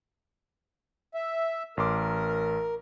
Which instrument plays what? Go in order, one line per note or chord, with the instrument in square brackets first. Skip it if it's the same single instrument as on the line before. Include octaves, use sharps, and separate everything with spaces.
[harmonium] E5
[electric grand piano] A1 C6 D6 [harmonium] A#4